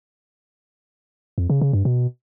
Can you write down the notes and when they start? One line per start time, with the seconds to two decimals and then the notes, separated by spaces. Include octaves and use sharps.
1.38 F2
1.50 C#3
1.61 C#3
1.73 G2
1.85 B2